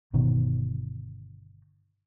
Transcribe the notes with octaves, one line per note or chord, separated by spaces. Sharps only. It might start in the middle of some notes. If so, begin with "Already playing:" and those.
G1 B2 D#3